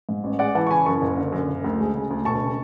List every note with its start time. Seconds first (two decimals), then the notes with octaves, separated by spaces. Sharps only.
0.09 G#2
0.24 A1
0.39 G#3 D5 F#5
0.55 E3 F#5 A5
0.67 C#6
0.70 C#3 G#5 B5
0.86 F#2 A5 C#6
1.02 F#1
1.17 D3
1.32 F#2
1.48 F#1
1.64 D2
1.80 G#3
1.94 C#3
2.11 D2
2.25 E1 A5 C#6
2.42 C#3